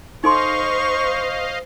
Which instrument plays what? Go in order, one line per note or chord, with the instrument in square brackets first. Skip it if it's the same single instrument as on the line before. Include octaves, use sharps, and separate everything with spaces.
[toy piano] D#4 A4 C6 [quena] C5 [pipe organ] D#5 F5 [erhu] C#6